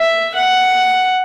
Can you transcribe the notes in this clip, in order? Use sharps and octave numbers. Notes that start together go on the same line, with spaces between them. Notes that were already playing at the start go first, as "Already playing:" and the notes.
Already playing: E5
F#5